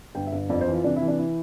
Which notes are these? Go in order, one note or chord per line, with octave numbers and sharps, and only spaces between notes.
G1 G5
E5
G1
F2 D5
C5
E3
F4
C3 D4
E4
E3
D4
E4